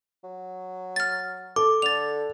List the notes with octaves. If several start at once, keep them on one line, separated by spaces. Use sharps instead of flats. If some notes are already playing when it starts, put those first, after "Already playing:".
F#3
F6 A6
A4 D6
D3 A6 F7